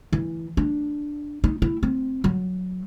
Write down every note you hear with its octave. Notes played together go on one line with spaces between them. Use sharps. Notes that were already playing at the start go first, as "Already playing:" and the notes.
E3
D4
D#4
E4
C4
F#3